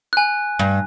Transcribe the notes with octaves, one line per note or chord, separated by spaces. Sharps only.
G#5 F#6
G2